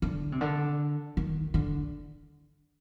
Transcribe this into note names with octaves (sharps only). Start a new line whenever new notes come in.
D3
C3
D3
D#3
D3